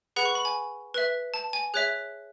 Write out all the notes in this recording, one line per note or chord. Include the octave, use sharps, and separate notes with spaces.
G#4 B4 F#5 B5
C#6
B5
G#5
B4 E5
A5
G#5
G#4 C#5 E5 F#6